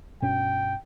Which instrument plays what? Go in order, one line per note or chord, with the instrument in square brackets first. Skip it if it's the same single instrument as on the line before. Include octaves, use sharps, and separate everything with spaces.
[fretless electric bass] G2 B2 C#4 [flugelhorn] G5